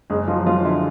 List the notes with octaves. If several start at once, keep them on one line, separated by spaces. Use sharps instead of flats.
F#1 G#3 G#4
F3 F#3 F4
F3 F#3 F4
D3 E4